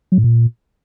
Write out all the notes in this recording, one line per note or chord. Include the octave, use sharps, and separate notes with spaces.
F#3
A2
A#2